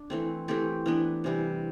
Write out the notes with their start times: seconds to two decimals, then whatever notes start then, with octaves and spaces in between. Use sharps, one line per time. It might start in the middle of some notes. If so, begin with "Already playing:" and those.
Already playing: D4
0.10 E3 A3 C4
0.48 E3 A3 C4 G4
0.86 E3 B3 D4
1.24 C3 E3 G3